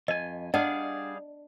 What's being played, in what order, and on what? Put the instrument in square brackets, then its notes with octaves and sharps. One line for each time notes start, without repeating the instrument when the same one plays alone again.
[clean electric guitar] F2 G#5 [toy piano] D#5
[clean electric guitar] G3 G#4 F5 [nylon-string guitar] D4 [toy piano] D#5 [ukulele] F#5